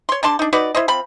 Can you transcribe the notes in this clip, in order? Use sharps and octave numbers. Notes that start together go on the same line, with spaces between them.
C#5 C6
D3 D4 A5 C6
D4 D#4
D#4 F#4 B4 D5
E4 C5 D#5
F3 C4 B5